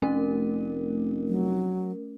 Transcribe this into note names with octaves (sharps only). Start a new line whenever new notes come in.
F1 A3 C#4 A#4
F#3